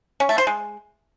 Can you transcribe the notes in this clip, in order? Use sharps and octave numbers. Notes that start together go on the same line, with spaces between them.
C#4
A3
C5
G#3